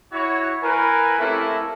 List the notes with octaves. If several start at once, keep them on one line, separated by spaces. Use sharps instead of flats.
E4 F#4 C#5
E3 A#4 B4 G#5
C3 A3 A#3 C#4 E4